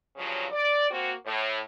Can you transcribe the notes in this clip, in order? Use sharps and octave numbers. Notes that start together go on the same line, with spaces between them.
G2 C#3 F3 F#3
D5
A#3 C4 F#4
A2